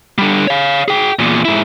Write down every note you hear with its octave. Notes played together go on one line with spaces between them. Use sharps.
D3 G3
C#5 F5
G#4 G5
E2 A#2
G#2 E4